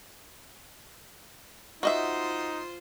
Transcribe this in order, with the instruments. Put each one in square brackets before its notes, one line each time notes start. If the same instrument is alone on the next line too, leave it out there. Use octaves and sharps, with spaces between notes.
[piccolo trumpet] D#4 [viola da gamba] F4 C5 [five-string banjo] F#4 D#5 E5